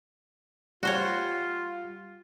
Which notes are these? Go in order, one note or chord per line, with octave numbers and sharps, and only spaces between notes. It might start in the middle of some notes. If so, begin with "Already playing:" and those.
G3 F4 F#4 C5 C#5